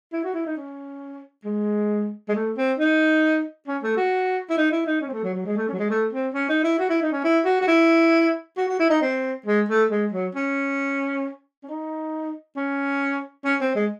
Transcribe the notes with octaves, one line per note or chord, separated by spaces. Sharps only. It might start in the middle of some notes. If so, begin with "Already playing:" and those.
E4
F#4
E4
D#4
C#4
G#3
G#3
A3
C4
D#4
C#4
A3
F#4
E4
D#4
E4
D#4
C#4
C4
A3
F#3
F#3
G#3
A3
C#4
F#3
G#3
A3
C4
C#4
D#4
E4
F#4
E4
D#4
C#4
E4
F#4
F#4
E4
F#4
F#4
E4
D#4
C4
G#3
A3
G#3
F#3
C#4
C#4
D#4
C#4
C#4
C4
G#3